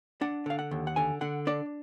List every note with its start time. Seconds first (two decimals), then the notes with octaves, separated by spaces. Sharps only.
0.21 D4 F#5
0.46 D3 F5
0.59 F#5
0.71 D#2
0.87 F#5
0.96 D3 G#5
1.21 D3 F#5
1.47 D4 D5